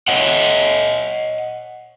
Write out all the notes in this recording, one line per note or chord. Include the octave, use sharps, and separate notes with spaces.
C#5 D#5 F#5